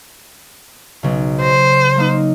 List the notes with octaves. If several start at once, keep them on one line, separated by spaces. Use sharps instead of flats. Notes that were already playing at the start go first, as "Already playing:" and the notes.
B1 C#3
C5 A#6
F#3 A#3 D#4